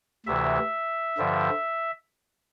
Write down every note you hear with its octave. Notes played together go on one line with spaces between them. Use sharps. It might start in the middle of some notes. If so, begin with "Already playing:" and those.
D2 C3 E3 E5
G2 D3 F3